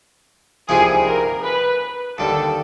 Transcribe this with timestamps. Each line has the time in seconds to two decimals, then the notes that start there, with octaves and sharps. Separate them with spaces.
0.68 C2 C3 F3 A#3 D#4 G#4
1.06 A#4
1.44 B4
2.18 D#2 D3 G3 A4